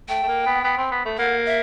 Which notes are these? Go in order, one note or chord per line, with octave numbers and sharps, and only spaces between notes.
A3 G5
A3
A#3
B3
B3
C4
B3
A3
A#3 F#5
E5